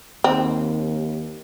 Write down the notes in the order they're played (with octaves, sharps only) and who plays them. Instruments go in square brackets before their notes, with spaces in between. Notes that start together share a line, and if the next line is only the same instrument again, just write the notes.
[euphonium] D#2 [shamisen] C4